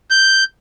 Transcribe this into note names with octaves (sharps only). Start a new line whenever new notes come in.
G6